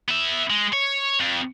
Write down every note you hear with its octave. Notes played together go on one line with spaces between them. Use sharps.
B3 E5
G#3
C#5
F2